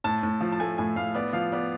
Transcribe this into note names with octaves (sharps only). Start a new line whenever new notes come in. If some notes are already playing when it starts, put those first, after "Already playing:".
A2 A5
A2
F3
A5
A3 G#5
A2 G#5
A2 F5
B3 D5
F3 F5
B3 D5